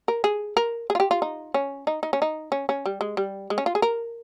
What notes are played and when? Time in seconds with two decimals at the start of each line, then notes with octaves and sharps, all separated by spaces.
0.08 A#4
0.24 G#4
0.57 A#4
0.90 G#4
0.95 F4
1.00 G4
1.11 F4
1.22 D#4
1.54 C#4
1.87 D#4
2.03 D#4
2.13 C#4
2.22 D#4
2.52 C#4
2.69 C#4
2.86 G3
3.01 G#3
3.17 G3
3.50 G#3
3.58 C#4
3.66 F4
3.75 G#4
3.82 A#4